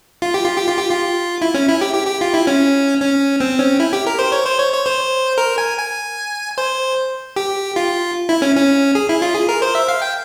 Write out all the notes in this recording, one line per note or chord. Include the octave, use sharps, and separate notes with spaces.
F4
G4
F4
G4
F4
G4
F4
E4
C#4
E4
G4
G4
G4
F4
E4
C#4
C#4
C4
C#4
E4
G4
A#4
C5
C#5
C5
C#5
C#5
C5
A#4
G#5
G#5
C5
G4
F4
E4
C#4
C#4
G#4
E4
F4
G#4
A#4
C5
E5
F5
G5